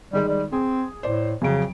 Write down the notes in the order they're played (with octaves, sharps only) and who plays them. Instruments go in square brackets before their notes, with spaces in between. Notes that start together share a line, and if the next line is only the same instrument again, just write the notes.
[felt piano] D#3 G#3 D5 [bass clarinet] G3
[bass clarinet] G3
[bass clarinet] C4 [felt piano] G#4
[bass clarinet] A2 [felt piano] C5 D5
[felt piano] F2 F#3 D7 [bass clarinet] C#3